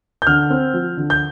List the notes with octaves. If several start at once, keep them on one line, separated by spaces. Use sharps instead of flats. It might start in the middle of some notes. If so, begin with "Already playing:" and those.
G6
D3 F6
C4
F3
D3
G6